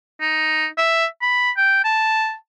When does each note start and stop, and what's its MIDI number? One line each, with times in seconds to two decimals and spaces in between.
0.21 0.66 63
0.78 1.06 76
1.22 1.51 83
1.57 1.81 79
1.84 2.34 81